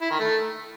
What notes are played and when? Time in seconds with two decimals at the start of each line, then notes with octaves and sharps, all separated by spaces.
0.02 E4
0.11 D#3
0.20 A3